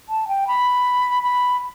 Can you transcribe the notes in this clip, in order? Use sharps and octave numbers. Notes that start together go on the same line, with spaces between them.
A5
G5
B5
B5